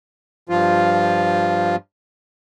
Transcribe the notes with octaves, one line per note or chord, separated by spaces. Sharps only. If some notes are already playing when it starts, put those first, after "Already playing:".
G2 F3 F4